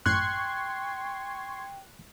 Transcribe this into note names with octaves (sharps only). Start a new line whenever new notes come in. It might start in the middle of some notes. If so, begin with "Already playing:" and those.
G#1 F#2 A2 G5 C6 C#6 F#6 G#6